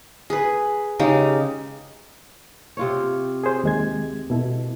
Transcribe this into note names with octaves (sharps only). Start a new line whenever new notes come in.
G#4 B4
C#3 G#3 D#4 G4
C3 F4 C#5
G#4 C5
D#2 G#3 G#6
B2 E4 A4